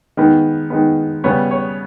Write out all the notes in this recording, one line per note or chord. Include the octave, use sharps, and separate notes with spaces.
D#3 G#3 B3
D#3 G#3 B3
C#3 G3 B3 C#5
C#5